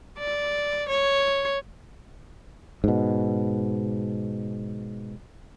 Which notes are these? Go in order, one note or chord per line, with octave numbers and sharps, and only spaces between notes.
D5
C#5
G#2 B2